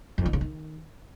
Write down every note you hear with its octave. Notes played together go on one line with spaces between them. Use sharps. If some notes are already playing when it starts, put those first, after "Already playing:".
F2
D#3
C#3
D#3